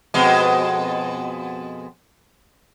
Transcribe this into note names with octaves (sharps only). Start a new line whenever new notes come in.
F2 B2 G#3